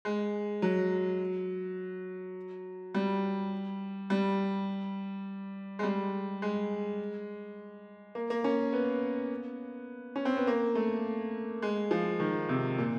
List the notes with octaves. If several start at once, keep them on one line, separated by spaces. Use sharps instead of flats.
G#3
F#3
G3
G3
G#3
G3
G#3
A#3
A#3
C#4
B3
C#4
C4
B3
A#3
A3
G#3
F3
D#3
C3
A#2